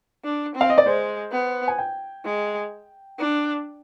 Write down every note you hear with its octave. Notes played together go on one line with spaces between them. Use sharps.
D4
C4
F5
D#5
D5
G#3 C5
B3
G#5
G5
G#3
D4